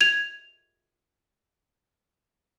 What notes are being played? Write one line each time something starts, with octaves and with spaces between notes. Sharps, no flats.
G#6 F7